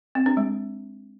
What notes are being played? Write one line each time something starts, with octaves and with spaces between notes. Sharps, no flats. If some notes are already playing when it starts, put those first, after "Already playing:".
C4
D4
G#3